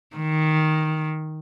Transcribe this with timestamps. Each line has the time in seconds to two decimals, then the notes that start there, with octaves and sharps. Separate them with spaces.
0.16 D#3